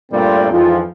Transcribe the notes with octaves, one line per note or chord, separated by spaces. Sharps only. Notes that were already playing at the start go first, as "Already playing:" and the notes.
G2 A#2 G3 A3 C4
F2 G#2 E3 F3